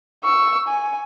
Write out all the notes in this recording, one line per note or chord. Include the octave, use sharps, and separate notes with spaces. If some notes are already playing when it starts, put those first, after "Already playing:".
C#6 E6
G#5